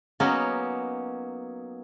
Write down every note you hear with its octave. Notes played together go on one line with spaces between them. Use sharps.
F#3 A#3 B3 C#4 D#4